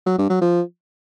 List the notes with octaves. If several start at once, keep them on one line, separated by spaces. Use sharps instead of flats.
F#3
G2
F#3
F3